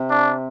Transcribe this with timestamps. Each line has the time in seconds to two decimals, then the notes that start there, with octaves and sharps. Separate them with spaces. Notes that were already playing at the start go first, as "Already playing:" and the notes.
Already playing: C3
0.10 D4